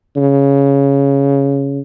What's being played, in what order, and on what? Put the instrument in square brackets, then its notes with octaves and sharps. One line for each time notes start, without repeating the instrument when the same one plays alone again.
[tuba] C#3